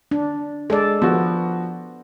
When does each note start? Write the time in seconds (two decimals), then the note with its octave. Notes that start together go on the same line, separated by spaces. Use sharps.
0.11 D4
0.70 G#3 A4 D5
1.02 F3 B3 F#4